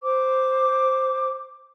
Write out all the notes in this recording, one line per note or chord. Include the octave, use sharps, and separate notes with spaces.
C5 D6